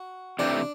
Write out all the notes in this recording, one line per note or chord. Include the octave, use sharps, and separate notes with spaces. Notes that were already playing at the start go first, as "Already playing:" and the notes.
Already playing: F#4
C3 E3 A3 C4 D4